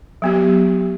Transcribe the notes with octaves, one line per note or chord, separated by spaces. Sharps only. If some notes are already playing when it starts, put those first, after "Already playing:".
F#3 B3 G4